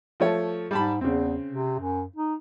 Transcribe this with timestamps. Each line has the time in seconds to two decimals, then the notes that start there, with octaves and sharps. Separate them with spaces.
0.20 F3 A3 C#5
0.71 G#2 G3 A5 B5
1.01 E2 C#3 C4
1.49 C3
1.79 F#2
2.16 D#4